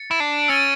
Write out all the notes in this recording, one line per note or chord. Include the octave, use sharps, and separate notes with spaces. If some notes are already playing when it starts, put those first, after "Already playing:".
Already playing: A6 C#7
E4
D4
C#4 E6 A6 D7 G7